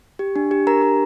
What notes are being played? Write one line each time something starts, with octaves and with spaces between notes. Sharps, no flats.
G4
D4
G4
D4 A#4 A#5
G4